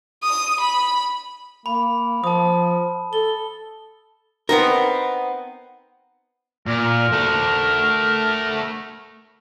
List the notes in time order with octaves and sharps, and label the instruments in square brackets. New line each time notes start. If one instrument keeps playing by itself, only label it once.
[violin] D#6
B5
[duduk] A#3 [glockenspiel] B5
[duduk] F3 [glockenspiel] A5 D#6
[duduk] A4 [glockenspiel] G7
[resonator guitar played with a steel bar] B3 C4 D#4 [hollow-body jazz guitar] A#4
[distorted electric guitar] A#2 [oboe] A#4
[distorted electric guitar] A3 F#5